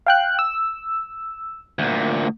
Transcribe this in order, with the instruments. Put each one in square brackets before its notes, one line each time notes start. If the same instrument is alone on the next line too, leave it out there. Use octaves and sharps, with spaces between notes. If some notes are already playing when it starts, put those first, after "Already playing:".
[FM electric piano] F5 G5 F#6
E6
[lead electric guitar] D2 A#2